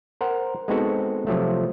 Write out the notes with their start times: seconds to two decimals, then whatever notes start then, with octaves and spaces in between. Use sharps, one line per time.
0.21 A#4 C5 F#5
0.68 G#3 B3 C4 D#4 F#4 A4
1.27 C3 F3 F#3 A3